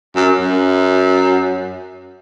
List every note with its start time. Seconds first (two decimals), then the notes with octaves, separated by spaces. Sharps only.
0.16 F#2
0.40 F#2